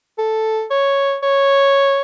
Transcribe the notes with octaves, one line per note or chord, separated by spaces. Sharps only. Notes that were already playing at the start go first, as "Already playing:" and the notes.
A4
C#5
C#5